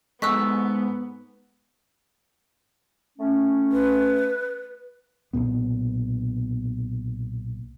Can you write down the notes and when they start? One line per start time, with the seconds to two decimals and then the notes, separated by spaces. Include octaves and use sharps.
0.22 G#2 B3 A4 D#5 C#6 E6 F#6 B6
3.17 A3 C#4
3.72 B4
5.33 B1 F#2 A#2 B3